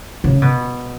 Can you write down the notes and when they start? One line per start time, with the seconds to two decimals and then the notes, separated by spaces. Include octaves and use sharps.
0.24 C#3
0.42 B2